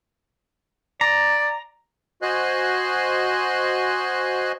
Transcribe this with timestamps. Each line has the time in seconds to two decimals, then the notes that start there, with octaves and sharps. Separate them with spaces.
1.01 D5 A#5
2.22 F#4 C5 D#5 G#5 C6 F#6